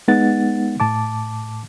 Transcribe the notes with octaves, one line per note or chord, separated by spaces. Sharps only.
G#3 B3 D#4 F#5 A6
A2 A5 D6